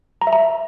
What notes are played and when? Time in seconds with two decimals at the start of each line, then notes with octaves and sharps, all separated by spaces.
0.22 A#5
0.27 E5
0.33 A#5